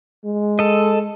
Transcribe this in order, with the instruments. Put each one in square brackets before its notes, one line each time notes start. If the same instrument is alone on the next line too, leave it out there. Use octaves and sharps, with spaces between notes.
[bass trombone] G#3
[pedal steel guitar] A4 D#5